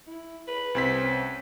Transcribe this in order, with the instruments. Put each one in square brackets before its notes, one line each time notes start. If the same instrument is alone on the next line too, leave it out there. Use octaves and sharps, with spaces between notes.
[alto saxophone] E4
B4
[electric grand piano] C2 C4 B6
[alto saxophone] C#4